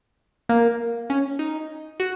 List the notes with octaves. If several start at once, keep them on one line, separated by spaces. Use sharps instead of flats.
A#3
C#4
D#4
F#4